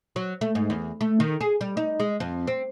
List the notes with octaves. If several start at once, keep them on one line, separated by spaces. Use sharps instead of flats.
F#3
A3
G#2
E2
A3
D#3
G#4
G3
D#4
G#3
F2
C4